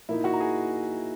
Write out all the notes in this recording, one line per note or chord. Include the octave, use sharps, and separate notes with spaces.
A#2 A#3 D#4 E4 E5
F#4 F#5
A#5
G#4 G#5